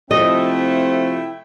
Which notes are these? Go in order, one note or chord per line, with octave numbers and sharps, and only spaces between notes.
C3 F3 A3 C4 E4 D#5 E5 G5